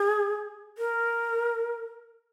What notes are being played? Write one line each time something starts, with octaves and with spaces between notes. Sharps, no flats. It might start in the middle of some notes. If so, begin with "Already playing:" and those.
Already playing: G#4
A#4